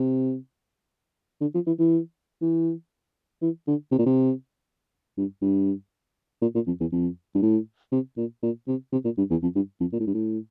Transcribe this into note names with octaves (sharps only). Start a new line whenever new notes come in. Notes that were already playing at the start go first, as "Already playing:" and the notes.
Already playing: C3
D3
F3
E3
E3
E3
E3
D3
C3
A#2
C3
G2
G2
A#2
A#2
F2
E2
F2
G2
A2
C3
A#2
A#2
C3
C3
A#2
G2
E2
F2
G2
F2
A#2
A2
G2
A2